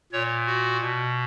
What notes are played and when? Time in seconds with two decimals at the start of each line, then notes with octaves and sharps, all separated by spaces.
0.12 A#2 C#5
0.46 F#4
0.81 B2